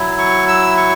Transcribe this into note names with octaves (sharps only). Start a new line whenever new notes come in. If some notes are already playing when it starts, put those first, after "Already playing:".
Already playing: F#3 E4
C#6
E6
C#6